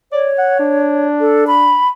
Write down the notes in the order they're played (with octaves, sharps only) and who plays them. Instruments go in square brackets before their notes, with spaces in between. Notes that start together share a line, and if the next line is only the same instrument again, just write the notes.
[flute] C#5 [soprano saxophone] D5
[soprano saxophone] F#5
D4
[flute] A4
B5